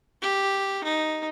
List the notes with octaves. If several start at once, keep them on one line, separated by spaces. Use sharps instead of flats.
G4
D#4